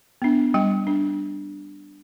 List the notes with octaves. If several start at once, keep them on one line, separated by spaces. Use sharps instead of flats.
B3 D4
G3 G5
D4